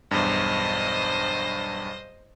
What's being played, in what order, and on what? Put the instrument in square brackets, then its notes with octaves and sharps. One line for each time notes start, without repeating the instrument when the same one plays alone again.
[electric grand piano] B1 E2 G2 [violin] C5 D#5